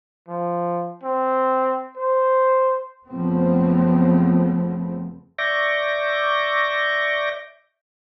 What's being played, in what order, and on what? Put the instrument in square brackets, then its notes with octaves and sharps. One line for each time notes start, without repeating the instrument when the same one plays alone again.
[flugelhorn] F3
C4
C5
[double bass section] F#1 C#3 F3 A3 B3 C4
[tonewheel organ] D5 E5 C#6 D6 G6 A#6